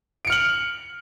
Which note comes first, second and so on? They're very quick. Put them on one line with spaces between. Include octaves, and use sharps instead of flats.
D7 C#7 F6 F#7